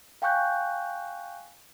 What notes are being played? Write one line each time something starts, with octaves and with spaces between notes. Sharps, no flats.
F5 G5 G#5 C#6 F#6 G6